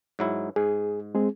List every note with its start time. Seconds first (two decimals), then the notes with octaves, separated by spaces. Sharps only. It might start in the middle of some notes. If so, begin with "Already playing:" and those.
0.19 G#2 F#3 E4
0.56 G#2 G#4
1.15 G#3 C4 G#4